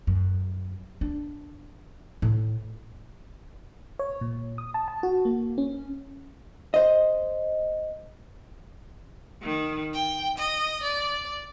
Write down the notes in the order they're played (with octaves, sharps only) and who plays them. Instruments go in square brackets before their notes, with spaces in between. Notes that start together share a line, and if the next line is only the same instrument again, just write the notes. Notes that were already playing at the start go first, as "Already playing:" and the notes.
[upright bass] F#2
D4
A2
[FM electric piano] C#5
A#2
D#6
A5
A5
F#4
A#3
C#4
[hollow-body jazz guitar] C5 D#5
[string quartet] D#3
G5
D#5
D5